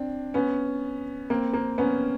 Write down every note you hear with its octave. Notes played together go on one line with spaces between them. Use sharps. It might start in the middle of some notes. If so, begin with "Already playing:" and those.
Already playing: C4 D4
B3 C#4
A#3 C4
A#3 C4
B3 C#4